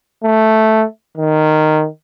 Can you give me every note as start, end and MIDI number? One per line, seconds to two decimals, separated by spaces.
0.24 0.85 57
1.17 1.87 51